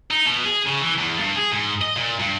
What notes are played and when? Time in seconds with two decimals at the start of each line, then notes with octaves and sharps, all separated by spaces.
0.11 D#4
0.26 B2
0.44 G#4
0.67 C#3
0.81 E3
0.98 E2
1.19 G2
1.36 G#4
1.52 G#2
1.81 D#5
1.96 A#2
2.19 G2